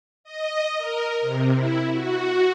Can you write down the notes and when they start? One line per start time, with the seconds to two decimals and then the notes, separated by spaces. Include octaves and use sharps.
0.24 D#5
0.78 A#4
1.21 C3
1.54 E4
1.91 F#4